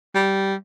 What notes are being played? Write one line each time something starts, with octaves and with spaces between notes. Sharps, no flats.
G3